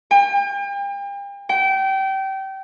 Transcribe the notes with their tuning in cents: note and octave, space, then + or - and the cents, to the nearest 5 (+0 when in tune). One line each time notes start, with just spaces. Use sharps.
G5 +40
G5 -25